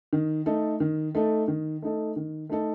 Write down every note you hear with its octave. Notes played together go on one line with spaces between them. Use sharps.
D#3
A3 D#4 A4
D#3
A3 D#4 A4
D#3
A3 D#4 A4
D#3
A3 D#4 A4